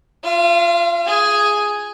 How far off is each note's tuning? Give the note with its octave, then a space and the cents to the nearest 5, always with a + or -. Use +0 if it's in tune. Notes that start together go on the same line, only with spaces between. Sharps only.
F4 +0 F5 -40
G#4 +5 G#5 +0